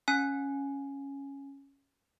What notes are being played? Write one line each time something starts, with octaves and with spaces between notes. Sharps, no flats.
C#4 G#5